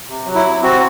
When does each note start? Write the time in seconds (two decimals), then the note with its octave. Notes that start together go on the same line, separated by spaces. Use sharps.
0.09 C3
0.26 F#3
0.35 E4
0.45 C3
0.63 C4 F#4